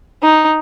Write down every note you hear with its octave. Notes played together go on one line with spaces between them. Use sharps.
D#4